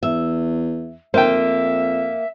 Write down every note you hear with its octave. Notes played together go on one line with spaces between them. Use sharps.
E2 E5
F2 A#3 C5 E5 G5